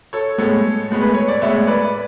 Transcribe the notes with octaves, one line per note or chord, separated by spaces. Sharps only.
A4 C#5
A2 G#3 B3 A4 C#5
A2 G#3 B3
B4
C#5
D5
A2 G#3 B3 C#5 E5
B4 D5